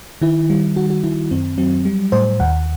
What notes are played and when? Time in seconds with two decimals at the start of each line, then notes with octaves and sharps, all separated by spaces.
0.22 D#3 E4
0.50 G3
0.76 D#3 F#4
0.90 F#4
1.04 D#3 E4
1.31 F#2 C4
1.58 F#3 C4
1.85 G3
2.12 A2 C5
2.40 D#2 F#5